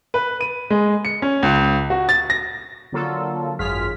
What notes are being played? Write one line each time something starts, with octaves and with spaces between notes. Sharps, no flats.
B4
D#7
G#3
C#7
C#4
C#2
F#4
A6
A#6
D3 F#3 A#3 F4 A4
G#1 F#2 F4 G#4 F6 B6